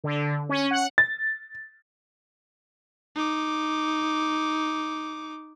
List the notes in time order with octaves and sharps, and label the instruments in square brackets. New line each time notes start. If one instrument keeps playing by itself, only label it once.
[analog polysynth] D3
C#4
F#5
[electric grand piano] A6
[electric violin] D#4 D6